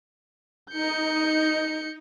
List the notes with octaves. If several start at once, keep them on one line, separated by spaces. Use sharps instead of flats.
D#4 G6 C#7